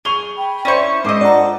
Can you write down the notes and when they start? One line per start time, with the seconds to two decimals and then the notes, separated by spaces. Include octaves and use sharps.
0.05 G#4 C#6 F7 G7
0.36 G5 B5
0.65 C#4 E4 C5 D5 E5 C#6
1.05 G#2 C5 D#5 D6 E6
1.21 D4 F4 A4 D5 F#5 A#5